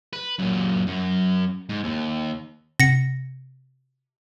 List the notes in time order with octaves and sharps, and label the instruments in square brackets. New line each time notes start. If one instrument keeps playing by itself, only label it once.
[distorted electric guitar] B4
F#2 A#2
F#2
G#2
D#2
[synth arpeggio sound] C3 [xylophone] A#6 C#7